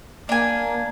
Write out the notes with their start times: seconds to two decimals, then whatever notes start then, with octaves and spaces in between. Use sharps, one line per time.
0.29 A#3 D4 G#5